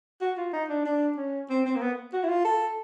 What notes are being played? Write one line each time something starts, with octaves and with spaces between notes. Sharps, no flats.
F#4
F4
D#4
D4
D4
C#4
C4
C4
A#3
B3
F#4
E4
F4
A4